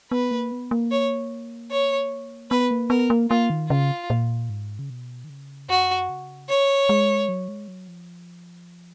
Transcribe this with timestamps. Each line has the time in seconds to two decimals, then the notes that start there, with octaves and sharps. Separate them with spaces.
0.11 B3 B4
0.31 A#3
0.52 B3
0.71 A#3
0.91 C#5
1.71 C#5
2.51 B3 B4
2.71 A#3
2.90 B3 A#4
3.10 A#3
3.30 A#3 F4
3.50 D#3
3.70 C#3 F4
4.10 A#2
4.50 G#2
4.79 C#3
4.90 B2
5.24 D#3
5.30 C#3
5.69 F#2 F#4
6.09 C#3
6.49 C#5
6.89 G#3
7.29 F#3
7.48 G#3
7.68 F#3
7.88 F3